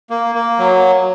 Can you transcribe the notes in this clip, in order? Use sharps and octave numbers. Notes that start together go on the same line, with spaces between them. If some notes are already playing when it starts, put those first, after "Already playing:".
A#3
A#3
F#3